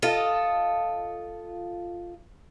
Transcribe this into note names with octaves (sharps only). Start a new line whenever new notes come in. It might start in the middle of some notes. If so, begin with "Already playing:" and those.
F4 A4 D#5